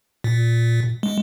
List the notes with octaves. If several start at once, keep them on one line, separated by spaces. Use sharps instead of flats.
A#2
G#3